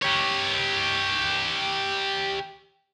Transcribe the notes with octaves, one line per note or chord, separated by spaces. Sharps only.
G4 C#5